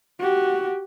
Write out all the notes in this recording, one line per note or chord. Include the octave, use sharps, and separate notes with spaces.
F#4 G4